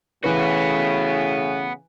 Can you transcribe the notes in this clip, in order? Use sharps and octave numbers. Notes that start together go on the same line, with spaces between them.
A2 C#3 E3 B3 F#4 B4